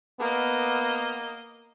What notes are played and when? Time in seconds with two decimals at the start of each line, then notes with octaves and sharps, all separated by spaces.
0.20 A#3 B3 D#5